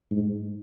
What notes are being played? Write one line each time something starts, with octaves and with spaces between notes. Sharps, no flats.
G#2